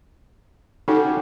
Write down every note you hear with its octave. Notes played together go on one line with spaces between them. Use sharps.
C#4 D#4 F#4 G4 A4